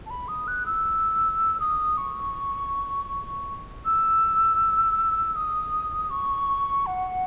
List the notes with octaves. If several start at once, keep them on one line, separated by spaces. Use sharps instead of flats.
A5
B5
D#6
F#6
E6
D#6
C#6
E6
D#6
C#6
F#5